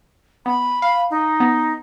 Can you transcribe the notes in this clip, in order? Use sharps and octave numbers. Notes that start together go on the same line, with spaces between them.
B3 B5
F5 B5
D#4
B3